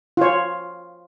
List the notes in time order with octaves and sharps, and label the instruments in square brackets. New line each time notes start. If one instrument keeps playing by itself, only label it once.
[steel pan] F4 C#5